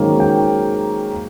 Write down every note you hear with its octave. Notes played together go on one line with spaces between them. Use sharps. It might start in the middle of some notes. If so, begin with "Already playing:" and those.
Already playing: G#2 D#3 F#3 A#3 C#4
G5